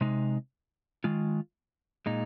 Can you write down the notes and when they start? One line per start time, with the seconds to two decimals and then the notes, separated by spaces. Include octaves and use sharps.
0.01 C3 G#3 D#4
1.04 D#3 G#3 F4
2.06 A#2 G#3 D#4